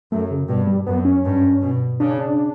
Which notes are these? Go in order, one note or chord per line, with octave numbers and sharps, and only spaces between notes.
F#2 A3
C#3
G2 B2
G3
F#2 B3
C#4
G2
B2
C#3 D4
D4